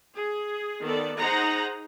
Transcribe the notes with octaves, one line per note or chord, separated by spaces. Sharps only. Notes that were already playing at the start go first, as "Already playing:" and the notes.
G#4
D#3 B3 A4 D5
D#4 G#4 C5 F#5 A#5